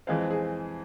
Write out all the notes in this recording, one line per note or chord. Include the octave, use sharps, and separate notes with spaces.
F2 E3 G#3 C4 F5
G#4